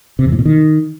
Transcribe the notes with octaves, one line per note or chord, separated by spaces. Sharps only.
C3
E2
A2
B2
D#3